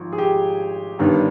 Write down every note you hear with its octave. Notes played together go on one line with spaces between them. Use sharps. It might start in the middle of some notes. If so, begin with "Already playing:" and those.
Already playing: G#1 G#2 F3
G#4
G4
G1 G2 D#3 B3 D4